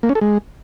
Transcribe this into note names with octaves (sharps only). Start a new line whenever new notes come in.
A#3
C#4
A4
G#3